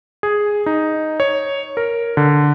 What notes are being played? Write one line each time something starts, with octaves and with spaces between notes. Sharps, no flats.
G#4
D#4
C#5
A#4
D3